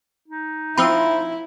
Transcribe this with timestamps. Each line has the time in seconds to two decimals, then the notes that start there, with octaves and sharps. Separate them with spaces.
0.28 D#4
0.77 F3 C4 E4 F4 B5 E6